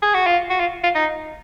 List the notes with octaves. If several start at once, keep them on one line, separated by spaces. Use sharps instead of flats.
G#4
F#4
F4
F#4
F4
F4
D#4